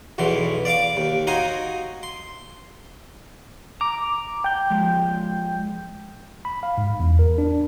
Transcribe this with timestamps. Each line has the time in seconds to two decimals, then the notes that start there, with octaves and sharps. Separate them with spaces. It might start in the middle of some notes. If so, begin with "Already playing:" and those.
0.18 B1 E2 B2 E3 C6
0.65 D5 F5 C#6 D6
0.97 D#2
1.27 D#4 F#4 F5 G#5 C6
2.03 C6
3.81 A#5 D6
4.44 G5 G6
4.70 F3 G#3
6.45 B5
6.63 F5
6.78 G#2
7.00 E2
7.19 A#4
7.38 D4